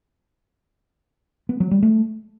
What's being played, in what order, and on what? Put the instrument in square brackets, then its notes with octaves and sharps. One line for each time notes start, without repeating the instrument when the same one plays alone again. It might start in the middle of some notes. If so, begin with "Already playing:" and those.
[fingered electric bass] B3
F#3
G3
A3